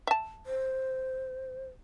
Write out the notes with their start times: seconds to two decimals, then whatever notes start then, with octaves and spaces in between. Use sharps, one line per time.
0.07 E5 A5
0.46 C5